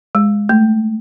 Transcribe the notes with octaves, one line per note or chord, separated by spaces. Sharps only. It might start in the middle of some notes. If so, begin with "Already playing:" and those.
G#3
A3